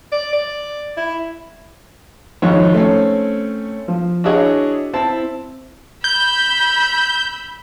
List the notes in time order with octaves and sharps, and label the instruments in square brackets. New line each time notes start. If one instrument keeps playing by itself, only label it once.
[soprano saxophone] D5
D5
E4
[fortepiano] G#1 G#2 F3 C#5
A3 C4 C#4
F3
D4 E4 F#4 G#4 C#5 D#5
C4 E4 A5
[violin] B5 E6 [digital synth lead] G6